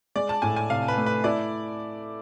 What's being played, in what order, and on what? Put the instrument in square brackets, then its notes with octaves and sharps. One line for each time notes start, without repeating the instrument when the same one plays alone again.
[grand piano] G#3 [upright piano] D5
[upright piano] A5
[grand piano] A2 [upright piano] G#5
[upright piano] G#5
[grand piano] C3 [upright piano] F5
[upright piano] B4
[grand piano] A3
[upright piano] B4
[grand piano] E4 [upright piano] D5